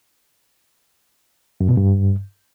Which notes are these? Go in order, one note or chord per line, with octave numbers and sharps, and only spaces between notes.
F#2
B2
G2